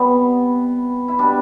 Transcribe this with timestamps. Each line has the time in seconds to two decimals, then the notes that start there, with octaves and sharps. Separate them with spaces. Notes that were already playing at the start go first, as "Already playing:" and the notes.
Already playing: C3 G3 B3
1.08 E4
1.19 B2 G3 D4